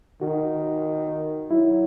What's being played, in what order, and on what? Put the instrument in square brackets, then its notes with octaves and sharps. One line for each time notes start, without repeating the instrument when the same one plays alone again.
[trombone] D#3 [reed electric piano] F#4
[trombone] F#3 [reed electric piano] E4